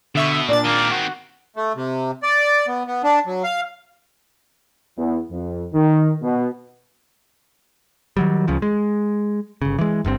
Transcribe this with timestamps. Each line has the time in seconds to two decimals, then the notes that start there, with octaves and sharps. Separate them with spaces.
0.15 B2 D3 E5 C#6
0.49 A#2 D4 D5 A6
0.64 D#3 A#3 C4
0.91 F#4
1.56 A3
1.75 C3
2.23 D5
2.67 B3
2.87 B3
3.04 D4
3.26 F#3
3.44 F5
4.97 E2
5.31 F2
5.73 D#3
6.22 B2
8.17 D#3 F#3 G3
8.48 C#2 C#3 F3
8.62 G#3
9.62 G1 C#3
9.79 E3 G#3
10.05 G1 G2 C#3 C4